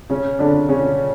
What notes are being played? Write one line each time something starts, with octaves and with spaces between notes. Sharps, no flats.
C#3 C#4
D3 D4
C#3 C#4